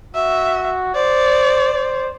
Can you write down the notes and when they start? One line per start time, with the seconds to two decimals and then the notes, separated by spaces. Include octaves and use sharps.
0.15 F#4 E5
0.95 C5 D5
1.74 C5